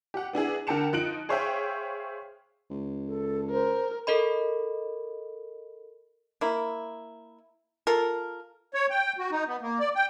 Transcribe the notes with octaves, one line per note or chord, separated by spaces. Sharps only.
G4 F#5
B3 D4 E4 G#4
D3 A#4 G5 A5 C#7 E7
F3 D#4 F#6 C#7 D7 F#7
G#4 C5 C#5 E5 F5 G5
C#2
A4
A#4 C5
A4 A#4 D#5 B5
A#3 E4
F4 A4 A#4
C#5
G5
F#4
D#4
B3
A#3
D5
G5